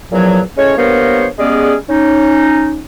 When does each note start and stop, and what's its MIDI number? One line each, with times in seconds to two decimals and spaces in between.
0.11 0.40 40
0.11 0.40 46
0.11 0.40 53
0.11 0.40 54
0.57 0.75 45
0.57 0.75 56
0.57 0.75 61
0.57 0.75 73
0.77 1.27 43
0.77 1.27 58
0.77 1.27 59
0.77 1.27 70
0.77 1.27 72
0.77 1.27 73
1.38 1.74 55
1.38 1.74 56
1.38 1.74 59
1.38 1.74 61
1.38 1.74 68
1.38 1.74 74
1.89 2.80 61
1.89 2.80 63